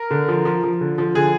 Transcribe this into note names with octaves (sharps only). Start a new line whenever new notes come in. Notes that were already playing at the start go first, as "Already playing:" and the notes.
Already playing: A#4
D3
F3
F3
F3
D3
F3
D3 G#4